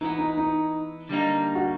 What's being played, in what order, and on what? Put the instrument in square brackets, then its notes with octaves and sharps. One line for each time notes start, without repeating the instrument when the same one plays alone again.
[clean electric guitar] E3 G#3 B3 [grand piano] D#4
[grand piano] D#4
D#4
[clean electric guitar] D3 G3 A#3 D#4
[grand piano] F#4